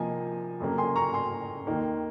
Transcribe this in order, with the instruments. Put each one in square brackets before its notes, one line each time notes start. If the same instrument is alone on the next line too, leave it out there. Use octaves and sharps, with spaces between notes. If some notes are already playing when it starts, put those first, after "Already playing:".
Already playing: [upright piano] C3 F3 A#3 D#4 G#5
F2 C#3 F#3 A#3
G#5 C6
A#5 C#6
G#5 C6
D#2 D#3 A#3 D#4